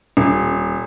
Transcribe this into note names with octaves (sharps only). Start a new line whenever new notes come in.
D#1